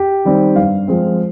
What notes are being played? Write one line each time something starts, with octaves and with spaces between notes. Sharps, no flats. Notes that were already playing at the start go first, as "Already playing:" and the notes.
Already playing: G4
D#3 G3 C4
G2 F5
F3 G#3 C4